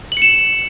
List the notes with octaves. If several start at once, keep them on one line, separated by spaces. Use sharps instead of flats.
F#7
C#7
E7